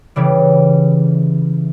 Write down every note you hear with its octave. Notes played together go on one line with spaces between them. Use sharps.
C#3 E3 G3